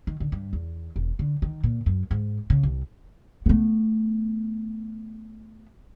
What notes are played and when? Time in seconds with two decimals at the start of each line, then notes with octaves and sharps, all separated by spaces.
0.07 D#3
0.20 D3
0.32 G2
0.53 E2
0.96 E1
1.19 D3
1.42 D#3
1.63 A#2
1.86 F#2
2.11 G#2
2.50 C#3
2.63 C2
3.46 A3 B3